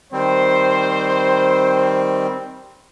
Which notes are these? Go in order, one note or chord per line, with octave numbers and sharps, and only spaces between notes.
D#3 G3 C4 C5